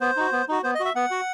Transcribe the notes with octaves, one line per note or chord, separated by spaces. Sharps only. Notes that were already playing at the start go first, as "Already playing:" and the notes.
B3 C5
D#4 F#4
B3
D#4 F#4
B3 C5
D#5
F#4
E5
B3 F#5
F#4